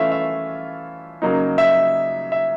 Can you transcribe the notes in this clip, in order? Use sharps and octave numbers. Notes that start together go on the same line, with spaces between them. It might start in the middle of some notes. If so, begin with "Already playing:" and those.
Already playing: E3 A3 C#4 F4 E5 F5
E5
C#3 F#3 A#3 D#4
E5
E5